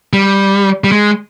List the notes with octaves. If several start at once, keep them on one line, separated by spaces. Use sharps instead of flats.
G3
G3
G#3